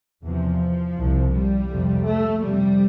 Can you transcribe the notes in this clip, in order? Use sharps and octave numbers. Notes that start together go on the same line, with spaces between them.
E2 C3 F3
C2 C3
G3
F2 C3
A3
F2 C3 G3